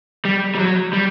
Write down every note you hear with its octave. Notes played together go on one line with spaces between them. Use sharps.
G3
G3
F#3
G3